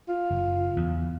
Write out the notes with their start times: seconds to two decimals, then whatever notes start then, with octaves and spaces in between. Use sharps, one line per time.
0.08 F4
0.31 F#1
0.77 E2